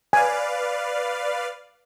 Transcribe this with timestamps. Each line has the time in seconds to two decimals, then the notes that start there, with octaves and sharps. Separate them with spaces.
0.13 B4 D5 F5 G#5